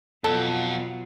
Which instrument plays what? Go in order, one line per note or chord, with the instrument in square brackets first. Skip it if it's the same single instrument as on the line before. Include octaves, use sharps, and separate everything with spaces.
[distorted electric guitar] F2 [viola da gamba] B2 F#3 F4 [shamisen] A4